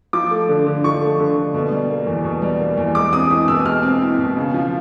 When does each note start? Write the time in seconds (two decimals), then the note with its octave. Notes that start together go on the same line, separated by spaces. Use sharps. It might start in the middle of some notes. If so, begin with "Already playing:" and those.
0.13 F3 D6
0.31 A3
0.49 D3
0.67 D3
0.84 F3 C#6
1.01 A3
1.19 D3
1.37 D3
1.54 B2
1.71 G3
1.90 A#3
2.07 E2
2.24 B2
2.42 G3
2.60 A#3
2.77 E2
2.95 G#3 D6
3.13 C4 D#6
3.30 E4 D#6
3.48 B2 E6
3.66 G#3 F6
3.83 C4
4.02 E4
4.19 B2
4.37 C#3
4.54 F3